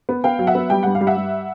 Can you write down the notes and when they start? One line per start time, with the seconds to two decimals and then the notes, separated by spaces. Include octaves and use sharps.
0.09 B3
0.24 B3 F5 G5
0.39 F#3
0.47 E5 F#5
0.55 B3
0.70 G3 G5
0.83 G2 F#5
0.95 F5
1.01 G3
1.07 E5 F#5
1.16 G3